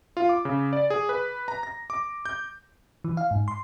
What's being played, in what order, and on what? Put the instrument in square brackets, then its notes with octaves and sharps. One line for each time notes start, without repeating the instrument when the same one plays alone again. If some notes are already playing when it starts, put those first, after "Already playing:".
[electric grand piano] F4
D6
C#3
D5
G#4
B4
A#5
A#6
D6
G6
[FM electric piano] E3
F5
G#2
C6